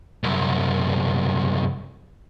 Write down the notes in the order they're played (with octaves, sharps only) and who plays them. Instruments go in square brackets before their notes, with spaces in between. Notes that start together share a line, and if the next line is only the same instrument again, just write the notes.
[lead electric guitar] C2 F#2